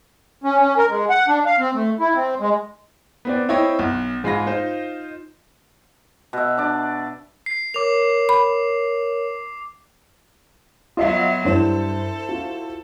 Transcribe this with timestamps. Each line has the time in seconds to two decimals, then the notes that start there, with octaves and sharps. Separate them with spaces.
0.44 C#4
0.60 C#4
0.77 A#4
0.89 G#3
1.10 F#5
1.28 D4
1.46 F5
1.59 C4
1.74 A3
2.00 E4
2.15 C4
2.40 G#3
3.25 B3 C4 D5
3.49 C4 E4 C#5 D#5 G5
3.79 B1
4.24 G#2 G#3 F4 B5 A#6
4.46 D#4 F4 C5
6.33 B2 E5
6.58 D4 D5
7.46 C7
7.74 A#4 C#5 D6 F7
8.29 B5
10.97 F#3 B3 F4 D#5 E5
11.45 G2 E4 A4 C5
12.29 F4 F#4